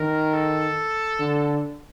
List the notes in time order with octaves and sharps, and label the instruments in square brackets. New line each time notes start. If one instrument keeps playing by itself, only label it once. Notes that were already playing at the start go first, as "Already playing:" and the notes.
Already playing: [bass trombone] D#3 [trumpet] A#4
[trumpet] A4
[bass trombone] D3